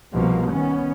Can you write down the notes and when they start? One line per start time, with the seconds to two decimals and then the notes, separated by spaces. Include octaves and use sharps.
0.13 C2 B2 F3 A#3
0.51 D#3 B3 C#4